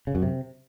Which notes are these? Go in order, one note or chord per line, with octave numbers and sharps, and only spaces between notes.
C#3
F#2
C3